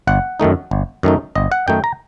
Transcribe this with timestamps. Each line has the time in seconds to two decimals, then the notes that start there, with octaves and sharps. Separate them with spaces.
0.07 G1 F#5
0.40 F#2 D#3 A3 D#4
0.71 G1
1.03 F#2 D#3 A3 D#4
1.35 G1 D#5
1.52 F#5
1.68 F#2 D#3 A3 D#4 G5
1.84 A#5